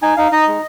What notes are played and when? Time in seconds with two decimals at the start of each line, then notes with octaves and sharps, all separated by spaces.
0.02 D#4 G#5
0.17 D#4 F5
0.32 D#4 D#5
0.47 G#3